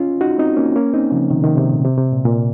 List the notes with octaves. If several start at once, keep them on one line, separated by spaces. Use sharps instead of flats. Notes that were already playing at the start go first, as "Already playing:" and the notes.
Already playing: C#4 F4
D#4 F#4
C4 D#4
A#3 C#4
A#3 C#4
C4 D#4
C#3 F3
C3 D#3
C3 D#3
C3
A#2
C3
C3
A#2
A#2